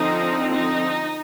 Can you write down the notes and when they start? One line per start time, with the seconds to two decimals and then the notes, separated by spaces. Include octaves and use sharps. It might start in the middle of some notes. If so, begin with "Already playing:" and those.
Already playing: D3 F3 C4 D#4
0.51 D#4